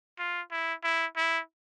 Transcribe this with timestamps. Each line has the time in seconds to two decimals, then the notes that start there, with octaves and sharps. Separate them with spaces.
0.19 F4
0.51 E4
0.83 E4
1.17 E4